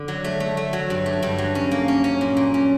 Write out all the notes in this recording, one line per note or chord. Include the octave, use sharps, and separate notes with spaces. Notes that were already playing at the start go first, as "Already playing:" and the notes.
Already playing: D3
F#3
A3
A3
A3
F#3
G2
A3
G2
F#3
C#4
A#3
C#4
C#4
A#2
A#2
C#4